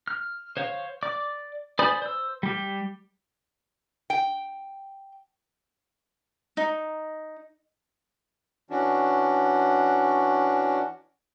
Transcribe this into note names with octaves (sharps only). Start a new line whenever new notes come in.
F6
C5 C#5 F5
D5 D6
C5 D5 G#5 B5 D#6
C5 E6
G3 G4
G5
D#4
E3 C#4 D4 F#4